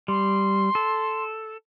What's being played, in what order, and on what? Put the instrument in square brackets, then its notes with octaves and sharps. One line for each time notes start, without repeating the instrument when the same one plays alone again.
[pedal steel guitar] G3 [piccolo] C6
[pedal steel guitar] A4